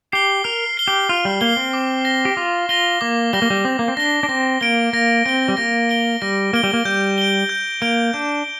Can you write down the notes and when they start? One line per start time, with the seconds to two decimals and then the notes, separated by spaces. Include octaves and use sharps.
0.12 G4 C7 G7
0.44 A#4 F6
0.77 C7 G7
0.88 G4
1.09 F4 F6
1.25 G3
1.41 A#3 C7 G7
1.57 C4
1.73 D6
2.05 A#6 G7
2.25 G4
2.37 F4 D6
2.69 F4 A#6 G7
3.01 A#3 D6
3.33 G3 A#6 G7
3.42 A#3
3.50 G3
3.65 C4 D6
3.79 A#3
3.88 C4
3.97 D4 A#6 G7
4.23 D4
4.29 C4 A#6
4.61 A#3 D7 G7
4.93 A#3 A#6
5.26 C4 D7 G7
5.48 G3
5.57 A#3 A#6
5.89 D7 G7
6.22 G3 A#6
6.53 A#3 D7 G7
6.64 G3
6.73 A#3
6.85 G3 G6
7.18 D7 G7
7.49 G6
7.82 A#3 D7 G7
8.13 D4 G6